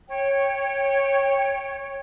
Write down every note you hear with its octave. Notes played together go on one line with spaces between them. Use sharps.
C#5 G5